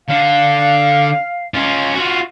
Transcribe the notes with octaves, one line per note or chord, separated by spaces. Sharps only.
D3 F5
C#4 F4
F4 F#4